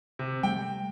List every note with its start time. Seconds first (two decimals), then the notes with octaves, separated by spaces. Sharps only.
0.19 C3
0.43 G3 A3 G5